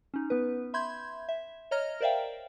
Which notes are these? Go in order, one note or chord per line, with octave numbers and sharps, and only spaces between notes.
C#4 D#4
B3 B4
E5 B5 C6 G6 G#6
E5
C#5 D#5 A#5 F6 A#6
A#4 C5 D5 E5 F5 G5